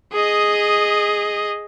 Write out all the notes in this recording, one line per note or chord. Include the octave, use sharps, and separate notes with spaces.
G#4 D#5